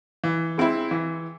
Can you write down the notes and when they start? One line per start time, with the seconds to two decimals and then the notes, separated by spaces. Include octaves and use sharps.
0.24 E3
0.58 G#3 C4 E4
0.91 E3